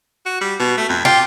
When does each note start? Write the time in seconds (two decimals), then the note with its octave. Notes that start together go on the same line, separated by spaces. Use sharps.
0.26 F#4
0.41 G3
0.60 B2
0.78 A3
0.89 F2
1.05 F4 G4